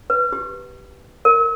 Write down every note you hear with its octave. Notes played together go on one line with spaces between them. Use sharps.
B4
G4
A#4